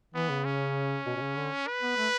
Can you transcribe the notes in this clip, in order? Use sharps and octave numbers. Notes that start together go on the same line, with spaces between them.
E3 B3
C#3
C#4
B2
B2
C#3
D3
B4
B3
A3